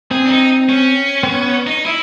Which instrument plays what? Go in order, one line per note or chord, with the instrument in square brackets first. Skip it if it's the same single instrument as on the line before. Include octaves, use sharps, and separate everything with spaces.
[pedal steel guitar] C4 [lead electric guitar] G#4
[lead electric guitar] D4
D#4
C#4
[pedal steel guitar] C4
B3
[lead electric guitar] D#4
E4